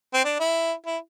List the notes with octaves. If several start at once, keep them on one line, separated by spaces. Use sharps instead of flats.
C4
D4
E4
E4